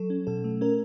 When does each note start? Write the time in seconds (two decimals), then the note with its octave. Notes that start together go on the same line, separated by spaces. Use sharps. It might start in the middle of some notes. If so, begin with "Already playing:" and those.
Already playing: F#3 A4
0.10 C#4
0.27 B2 A4
0.44 A3
0.61 C#4 A#4